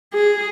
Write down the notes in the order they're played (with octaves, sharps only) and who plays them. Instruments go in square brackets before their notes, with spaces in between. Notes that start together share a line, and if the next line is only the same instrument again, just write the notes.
[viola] G#4